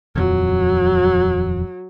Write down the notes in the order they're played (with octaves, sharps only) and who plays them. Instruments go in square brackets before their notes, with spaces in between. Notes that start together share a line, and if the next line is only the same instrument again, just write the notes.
[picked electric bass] D#1 F2 F3 [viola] F#3